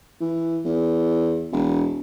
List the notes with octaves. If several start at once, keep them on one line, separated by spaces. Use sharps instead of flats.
E3
E2
E1